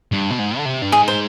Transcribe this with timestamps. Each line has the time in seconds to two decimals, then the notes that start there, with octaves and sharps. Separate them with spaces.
0.12 G2
0.30 B2
0.39 G#2
0.57 D3
0.65 C3
0.82 G2
0.92 G#2 G#4
1.08 C5